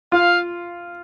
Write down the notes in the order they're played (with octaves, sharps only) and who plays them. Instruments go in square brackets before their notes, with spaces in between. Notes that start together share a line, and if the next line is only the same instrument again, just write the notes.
[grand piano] F4 [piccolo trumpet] F5